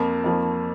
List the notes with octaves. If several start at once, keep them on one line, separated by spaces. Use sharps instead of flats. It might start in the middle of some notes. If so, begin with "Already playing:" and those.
Already playing: F2 F3 A#3
F2 F3 A#3